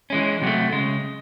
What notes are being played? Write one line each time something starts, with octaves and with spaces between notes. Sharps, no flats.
E3 G#3 C#4
C3 F#3 A3
C#3 G#3